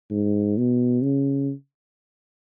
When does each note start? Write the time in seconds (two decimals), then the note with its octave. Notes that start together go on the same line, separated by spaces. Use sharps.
0.11 G#2
0.58 B2
1.03 C#3